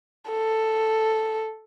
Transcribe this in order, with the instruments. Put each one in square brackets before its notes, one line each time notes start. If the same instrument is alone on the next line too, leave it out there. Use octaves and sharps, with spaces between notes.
[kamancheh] A4